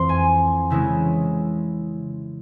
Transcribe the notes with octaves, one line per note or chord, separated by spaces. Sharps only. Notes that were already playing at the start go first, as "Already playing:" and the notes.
Already playing: F2 E3 C6
G#5
C#3 E3 G#3 C#4 E4